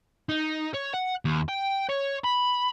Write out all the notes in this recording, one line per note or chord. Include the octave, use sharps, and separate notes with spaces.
D#4
C#5
F#5
D#2
G5
C#5
B5